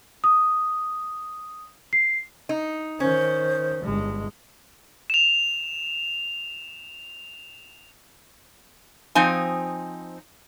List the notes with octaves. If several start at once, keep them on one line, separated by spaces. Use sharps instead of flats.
D#6
C7
D#4
D#3 C#4 C5
G1 G#3
E7 F7
F3 C4 D#4 G#5